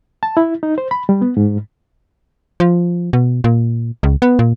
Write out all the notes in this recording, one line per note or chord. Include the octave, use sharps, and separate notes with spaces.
A5
E4
D#4
C5
B5
G3
B3
G#2
F3
B2
A#2
C#2
B3
A#2